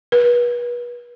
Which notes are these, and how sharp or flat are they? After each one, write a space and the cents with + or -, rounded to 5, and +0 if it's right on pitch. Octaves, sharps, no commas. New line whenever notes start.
B4 -35